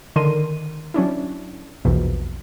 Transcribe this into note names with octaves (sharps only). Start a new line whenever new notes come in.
D3 D#3 A#4 C6 D#7
F#3 C#4 D4 E4
A#1 E2 B2